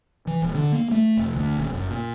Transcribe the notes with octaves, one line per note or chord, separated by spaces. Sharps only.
E3
D#1
D3
A#3
A3
F1
D2
D#1
F#1
A#2